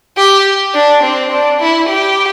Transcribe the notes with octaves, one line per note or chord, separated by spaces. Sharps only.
G4
D4
C4
D4
E4
G4